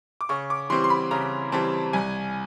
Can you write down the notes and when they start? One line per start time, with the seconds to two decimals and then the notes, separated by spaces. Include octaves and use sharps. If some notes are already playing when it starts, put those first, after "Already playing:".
0.21 D6
0.29 C#3 C#6
0.50 D6
0.70 E3 G3 C4 C6
0.84 C6
0.90 B5
1.11 C#3 A#5
1.52 E3 G3 C4 A5
1.93 C2 G#5